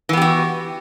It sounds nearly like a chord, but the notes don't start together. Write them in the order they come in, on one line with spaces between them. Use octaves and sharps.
E3 B3 G4 F#4